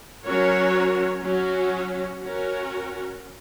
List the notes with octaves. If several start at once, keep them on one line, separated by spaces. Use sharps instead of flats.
F#3 C#4 F#4 A#4 C#5
F#3 C#4 F#4
C#4 F#4 A#4